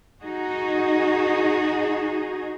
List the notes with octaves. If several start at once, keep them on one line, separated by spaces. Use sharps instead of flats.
D#4 F#4 G#4